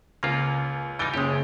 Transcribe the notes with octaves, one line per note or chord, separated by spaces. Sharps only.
C#2 A#3 F4
E3 G3 D#4 A6 D7 G7
F#1 G#3 C#4 G4 D#6